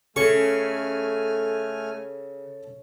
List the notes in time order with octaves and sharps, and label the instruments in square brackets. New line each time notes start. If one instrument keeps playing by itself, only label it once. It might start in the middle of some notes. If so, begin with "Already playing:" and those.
[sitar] C#3 [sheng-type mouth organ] A3 G#5 F6 [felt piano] A4 [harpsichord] C#6